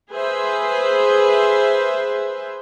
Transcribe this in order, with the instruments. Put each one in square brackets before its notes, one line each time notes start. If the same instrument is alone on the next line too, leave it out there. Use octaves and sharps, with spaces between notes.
[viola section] G#4 B4 C5 E5